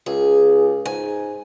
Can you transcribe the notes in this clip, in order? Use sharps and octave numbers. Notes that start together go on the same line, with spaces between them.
C#2 G#4
G#2 G#5